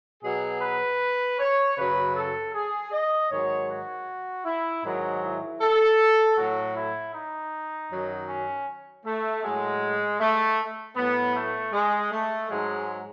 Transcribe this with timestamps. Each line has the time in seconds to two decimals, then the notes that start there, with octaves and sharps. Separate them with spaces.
0.23 B2 F#3 G#4
0.61 B4
1.39 C#5
1.77 F#2 C#3 F#3 B4
2.15 A4
2.54 G#4
2.92 D#5
3.30 G#2 D#3 F#3 C#5
3.68 F#4
4.45 E4
4.83 G#2 D#3 F#3
5.22 E4
5.61 A4
6.37 A2 F#3 F#4
6.75 E4
7.14 D#4
7.90 F#2 D#3 F#3
8.28 C#4
9.05 A3
9.43 A2 F#3 G#3
10.20 A3
10.96 A2 F#3 B3
11.35 A3
11.73 G#3
12.12 A3
12.50 G#2 F#3 G#3